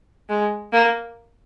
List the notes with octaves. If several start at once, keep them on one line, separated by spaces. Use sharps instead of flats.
G#3
A#3